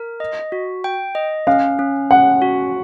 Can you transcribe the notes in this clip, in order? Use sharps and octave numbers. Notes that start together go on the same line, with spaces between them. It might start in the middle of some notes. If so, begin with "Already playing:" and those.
Already playing: A#4
D#5
F#4
G5
D#5
C#4 F5
C#4
C#4 F#5
F#4